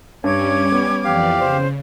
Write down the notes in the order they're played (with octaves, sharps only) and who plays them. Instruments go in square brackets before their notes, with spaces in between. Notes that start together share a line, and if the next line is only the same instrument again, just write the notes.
[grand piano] G2 [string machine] G3 C#4 [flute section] C#5 D6 G#6
[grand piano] B3
[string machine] F2 E3 D5 [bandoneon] G4 F5
[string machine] C#3 [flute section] C5